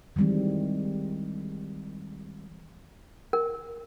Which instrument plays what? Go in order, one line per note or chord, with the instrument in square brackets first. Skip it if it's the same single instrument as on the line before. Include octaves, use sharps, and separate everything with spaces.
[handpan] D#3 E3 G3 G#3 C4
[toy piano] A#4